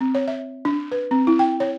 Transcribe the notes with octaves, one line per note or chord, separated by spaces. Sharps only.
C4
C#5
E5
D4
B4
C4
E4
G5
C#5